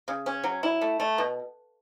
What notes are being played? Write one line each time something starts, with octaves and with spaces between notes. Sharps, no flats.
C#3
C#4
F#3
E4
A3
A3
B2